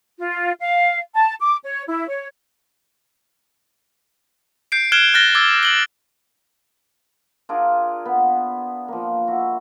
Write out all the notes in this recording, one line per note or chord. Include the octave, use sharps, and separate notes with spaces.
F4
F5
A5
D6
C#5
E4
C#5
G6 C7 D7
F6 F#6 G#6 D7 E7 G7
F6 F#6 A6 A#6 G7
D6 E6 G#6 A6
D7 F#7 G7
D4 F4 G#4 A#4
B3
F3 A#3
E4 F#4